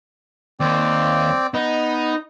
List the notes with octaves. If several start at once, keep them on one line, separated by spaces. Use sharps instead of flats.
D#2 C4 D5
B3 D#4